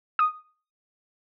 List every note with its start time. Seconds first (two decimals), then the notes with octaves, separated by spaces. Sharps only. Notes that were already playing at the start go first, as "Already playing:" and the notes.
0.19 D#6